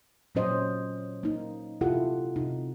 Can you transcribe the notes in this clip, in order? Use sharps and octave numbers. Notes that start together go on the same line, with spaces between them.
A#2 F#3 C#4 C5 D#5
A#3 D#4
C3 E4 F4 G4 A4 F#5
C3 D#4